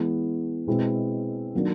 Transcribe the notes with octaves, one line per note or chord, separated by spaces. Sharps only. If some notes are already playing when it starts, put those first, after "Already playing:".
Already playing: E3 G#3 B3
B2 G#3 C4 E4
D#3 F#3 A#3 D4